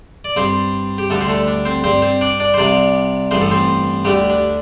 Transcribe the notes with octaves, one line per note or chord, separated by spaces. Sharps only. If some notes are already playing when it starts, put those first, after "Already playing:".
D5
G2 G3 C4 C5
G4
D2 D3 G3 A3 A4
C5
A3 A4
D4
C4 C5
G2 G3 C4 C5
C4 C5
D4 D5
D4 D5
C5
C2 C3 G3 D4 D5
A1 G2 E3 G3 C5
A4
C4 C5
D2 D3 G3 A3 G4
D4